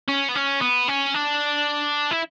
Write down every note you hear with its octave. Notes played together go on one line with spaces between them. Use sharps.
C#4
B3
C#4
B3
C#4
D4
E4